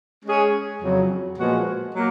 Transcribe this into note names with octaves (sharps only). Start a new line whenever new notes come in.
G#3 C#4 G#4 C#5
F2 C#3 F#3
A#2 F3 G#3 B3 F#4
F#3 A#3